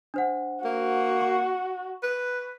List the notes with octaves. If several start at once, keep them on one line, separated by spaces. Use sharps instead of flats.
D4 C5 F#5
A#3 F#4
C#6
B4